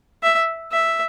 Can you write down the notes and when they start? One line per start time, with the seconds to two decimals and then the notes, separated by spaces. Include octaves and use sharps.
0.23 E5
0.72 E5